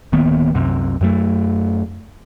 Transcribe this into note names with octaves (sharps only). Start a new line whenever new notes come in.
D1 D#3 A#3 B3
C2 F#2 C3
F#2 F#3 A3